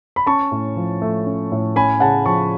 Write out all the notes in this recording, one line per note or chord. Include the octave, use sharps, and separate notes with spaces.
B5
C#4 A5 C#6
A2
F3
A3
C#4
A2
C#4 G#5 B5
C#3 F#5 A5
F3 A5 C#6